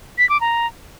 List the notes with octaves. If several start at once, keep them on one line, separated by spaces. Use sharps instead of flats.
B6
D6
A#5